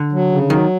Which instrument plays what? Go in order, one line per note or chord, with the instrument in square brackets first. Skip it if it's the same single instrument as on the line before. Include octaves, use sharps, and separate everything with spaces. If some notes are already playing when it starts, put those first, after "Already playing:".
Already playing: [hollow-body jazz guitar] D3
[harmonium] F#3
C#3
[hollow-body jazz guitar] D#3 [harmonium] F#3